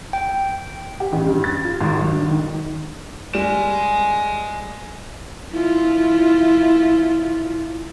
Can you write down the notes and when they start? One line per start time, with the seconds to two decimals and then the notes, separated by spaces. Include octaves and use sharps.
0.13 G5
1.00 G4
1.12 A1
1.27 G2
1.44 A6
1.65 F4
1.80 G#1
2.01 F#3
2.12 D3
2.31 D#3
3.34 G3 G#3 E7
5.52 E4 F4